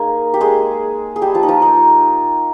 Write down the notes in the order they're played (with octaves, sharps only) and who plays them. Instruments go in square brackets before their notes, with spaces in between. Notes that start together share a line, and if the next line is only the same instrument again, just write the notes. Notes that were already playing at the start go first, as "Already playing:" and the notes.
Already playing: [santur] A#3 D#4 G#4 A#4
G4
G#3 G#4
G#4
G3 G4
F3 F4
D#4
F3 F4
D#4